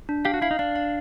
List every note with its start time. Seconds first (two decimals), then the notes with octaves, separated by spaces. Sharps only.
0.09 D4
0.25 G4 F5
0.34 F#4
0.42 E4 F5
0.51 D#4
0.59 D4 F5
0.76 F5